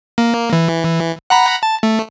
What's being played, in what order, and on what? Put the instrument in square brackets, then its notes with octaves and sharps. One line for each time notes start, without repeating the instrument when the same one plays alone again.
[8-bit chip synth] A#3
E3
F#5 A#5 B5
A5
A3